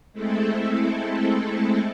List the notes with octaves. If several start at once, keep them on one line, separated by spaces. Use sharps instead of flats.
G#3 A3 C4 E4 A4